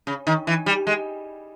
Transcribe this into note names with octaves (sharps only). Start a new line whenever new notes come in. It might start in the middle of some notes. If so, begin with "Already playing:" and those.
C#3
D#3
E3
G3
G#3